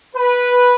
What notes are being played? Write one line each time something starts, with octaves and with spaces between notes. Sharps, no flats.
B4